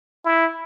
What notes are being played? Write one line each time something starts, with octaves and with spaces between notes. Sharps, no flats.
E4